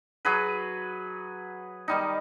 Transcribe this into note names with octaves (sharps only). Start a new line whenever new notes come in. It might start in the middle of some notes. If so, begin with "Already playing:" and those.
F#3 G#4 B4
D#3 G3 D#4